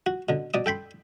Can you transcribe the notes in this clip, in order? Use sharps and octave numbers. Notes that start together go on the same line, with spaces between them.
F#4
B2 D3
B2 D5 D#6
A4 G5 B5 C6